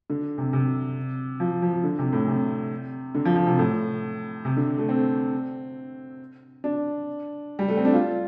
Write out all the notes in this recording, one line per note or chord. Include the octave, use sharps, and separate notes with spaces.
D3
C3
C3
F3
F3
D3
C3
A2
C3
D3
F3
F3
C3
A2
C3
D3
A3
C4
D4
G3
A3
C4
D4
F4